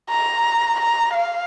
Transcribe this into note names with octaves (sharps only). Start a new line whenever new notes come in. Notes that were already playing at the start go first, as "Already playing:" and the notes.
A#5
A#5
F5